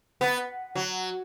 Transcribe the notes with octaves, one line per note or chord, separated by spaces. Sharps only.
B3
F#3